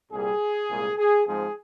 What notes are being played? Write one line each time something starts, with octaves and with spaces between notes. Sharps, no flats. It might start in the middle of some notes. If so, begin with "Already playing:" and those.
C2 A#2 G3 G#4
C2 A#2 G#3
G#4
G#2 F3 G#3 C4 G#4